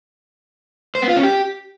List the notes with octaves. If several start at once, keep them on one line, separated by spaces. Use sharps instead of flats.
C5
B3
F4
C#4
G4